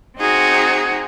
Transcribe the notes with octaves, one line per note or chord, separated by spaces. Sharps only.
C4 D#4 F#4 G#4